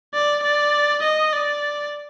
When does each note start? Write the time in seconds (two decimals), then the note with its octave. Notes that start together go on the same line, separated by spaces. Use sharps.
0.14 D5
0.44 D5
1.03 D#5
1.33 D5